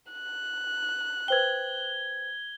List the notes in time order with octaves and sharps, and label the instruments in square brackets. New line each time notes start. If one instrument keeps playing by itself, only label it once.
[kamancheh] F#6
[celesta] B4 C5 G5 [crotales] G#6 G7